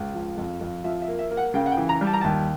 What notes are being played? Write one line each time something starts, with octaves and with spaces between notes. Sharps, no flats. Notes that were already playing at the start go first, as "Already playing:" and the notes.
Already playing: C#2
F3
F2
F2
F3 E5
E5
A#3
E5
A#3
F#5
C#3 G5
F#5
G5
E3
A#5
G3
A5
A#5
D#2 A5